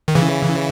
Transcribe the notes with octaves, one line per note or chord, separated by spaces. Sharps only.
D#3
C#3 E3